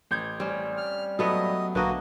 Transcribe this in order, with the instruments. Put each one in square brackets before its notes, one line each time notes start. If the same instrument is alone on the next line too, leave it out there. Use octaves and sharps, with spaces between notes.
[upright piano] A1 G6 G#6
[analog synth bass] G3 [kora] C4 C#4
[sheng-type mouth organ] F6
[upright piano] F#3 [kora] A3 B3 A4 [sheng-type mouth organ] D#5
[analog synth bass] B1 [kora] D3 D4 D#5 [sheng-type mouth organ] A#3 F#4 [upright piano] B4